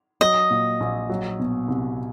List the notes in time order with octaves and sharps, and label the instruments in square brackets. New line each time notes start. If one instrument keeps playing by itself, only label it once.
[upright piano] F#3 [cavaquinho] D#5
[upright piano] A#2
A#1
F#3
B2
C2